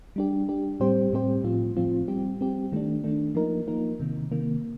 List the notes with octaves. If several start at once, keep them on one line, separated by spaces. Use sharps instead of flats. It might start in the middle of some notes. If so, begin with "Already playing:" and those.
G3 D4 G4
G3 D4 G4
A2 G3 C4 G4 C5
A2 G3 C4 G4 C5
A2 F3 C4 F4
A2 F3 C4 F4
G3 C4 G4
G3 C4 G4
D#3 A3 D4
D#3 A3 D4
F3 A#3 D#4 A#4
F3 A#3 D#4 A#4
C3 D#3 A#3
C3 D#3 A#3